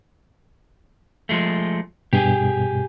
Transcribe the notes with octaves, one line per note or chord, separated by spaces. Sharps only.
F3 G#3 A3
G2 B2 G4 G#4